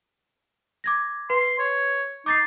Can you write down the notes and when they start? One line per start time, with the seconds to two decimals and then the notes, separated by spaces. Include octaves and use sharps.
0.84 D6 G#6 A#6
1.30 B4 C6
1.59 C#5
2.26 D#4 D6 A6 C7